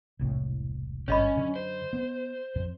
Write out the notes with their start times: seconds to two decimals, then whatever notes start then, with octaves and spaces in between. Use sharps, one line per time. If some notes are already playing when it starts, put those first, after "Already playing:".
0.19 E1 C2 A2
1.08 G#1 G2 C#4 C#5 D#5 B5
1.36 F#2 D3
1.56 C5
1.93 B3
2.56 F2